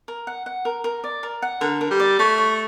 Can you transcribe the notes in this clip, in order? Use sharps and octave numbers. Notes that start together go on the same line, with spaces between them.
A#4
F#5
F#5
A#4
A#4
D5
A#4
F#5
D3 A#4
A#4
G3
D5
A3 C#5
C#5